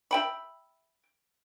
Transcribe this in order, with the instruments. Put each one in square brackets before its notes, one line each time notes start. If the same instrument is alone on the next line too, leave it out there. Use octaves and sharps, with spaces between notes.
[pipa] E5 G5 B5